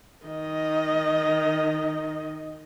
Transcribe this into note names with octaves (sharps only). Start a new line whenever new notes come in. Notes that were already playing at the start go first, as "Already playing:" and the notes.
D#3 D#5